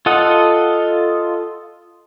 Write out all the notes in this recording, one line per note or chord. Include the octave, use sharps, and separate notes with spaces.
F4 A4 D#5 F#5